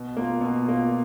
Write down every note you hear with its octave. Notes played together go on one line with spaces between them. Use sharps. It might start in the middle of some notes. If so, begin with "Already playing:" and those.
Already playing: B2
A#3 F4
B2
A#3 F4